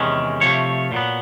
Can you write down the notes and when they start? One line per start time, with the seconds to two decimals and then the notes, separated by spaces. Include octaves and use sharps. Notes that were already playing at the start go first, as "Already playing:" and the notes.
Already playing: E2 C3 D#3 G#3 C#4
0.41 C3 F3 A3 C#5
0.92 A#2 F#3 B3